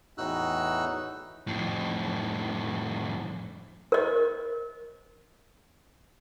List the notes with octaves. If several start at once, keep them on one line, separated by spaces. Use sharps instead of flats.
E2 A2 D#4 F#4 E6 F#6
F2 A2
A#4 D#5